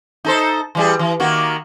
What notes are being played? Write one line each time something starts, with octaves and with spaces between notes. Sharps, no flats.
D#4 A4 C5
E3 G3 G#4
E3
D#3 A#3 F#4